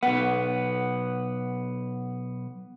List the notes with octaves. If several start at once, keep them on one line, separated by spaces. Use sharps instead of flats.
B1 B3 F#5